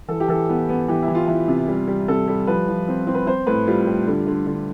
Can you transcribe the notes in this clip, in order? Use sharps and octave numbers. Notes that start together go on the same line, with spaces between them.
E3 A4
G4
E3 A4
B3
B3
E3 G4
E4
E3
F4
E3
C3
G3
G3
C3 A4
G3
F3 B4
F3
C4
C4
B4
C4 C5
A2 B4
G3 F4
G3
D3
D3
D3